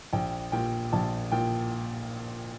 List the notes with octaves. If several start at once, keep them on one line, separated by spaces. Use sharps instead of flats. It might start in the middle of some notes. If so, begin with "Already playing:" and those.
A#1 G5
A#2 G5
A#1 A5
A#2 G5